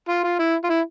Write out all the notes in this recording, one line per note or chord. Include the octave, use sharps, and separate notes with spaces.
F4
F4
E4
F4
E4